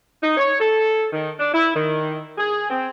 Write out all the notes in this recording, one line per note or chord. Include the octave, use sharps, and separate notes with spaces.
D#4
C#5
A4
D#3
D4
E4
D#3
G#4
C4